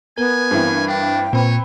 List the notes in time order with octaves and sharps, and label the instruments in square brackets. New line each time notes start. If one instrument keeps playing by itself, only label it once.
[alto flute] B3 [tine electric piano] A#4 [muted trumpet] G#5
[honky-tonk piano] G2 E3 C4
[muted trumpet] D4 [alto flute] G5
[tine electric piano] A#2 [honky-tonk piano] C4 B4 [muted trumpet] C#5